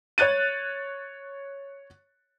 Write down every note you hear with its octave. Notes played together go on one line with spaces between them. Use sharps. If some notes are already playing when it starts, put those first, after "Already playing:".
C#5 F#6 A6 D#7